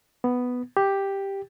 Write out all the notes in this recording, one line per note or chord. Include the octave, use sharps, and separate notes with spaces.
B3
G4